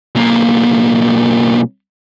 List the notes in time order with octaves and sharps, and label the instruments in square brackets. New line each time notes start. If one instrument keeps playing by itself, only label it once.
[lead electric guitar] B1 A#3